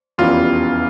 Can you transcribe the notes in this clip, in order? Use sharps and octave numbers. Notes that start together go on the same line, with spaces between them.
F1 E2 E3 G3 C#4 F4